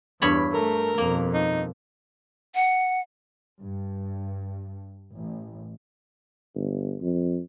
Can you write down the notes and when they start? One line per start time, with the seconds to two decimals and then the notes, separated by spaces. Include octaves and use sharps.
0.22 E2 G2 C#5 B5
0.54 A3 A#4
0.98 F2 B2 A#3
1.34 D#4
2.55 F#5
3.59 G2
5.15 A1
6.55 G1
7.01 F2